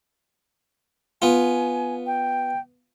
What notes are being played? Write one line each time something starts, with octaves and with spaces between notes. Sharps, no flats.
B3 F4 G#5
G5